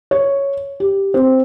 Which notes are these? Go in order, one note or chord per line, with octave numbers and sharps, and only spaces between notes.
C#5
G4
C4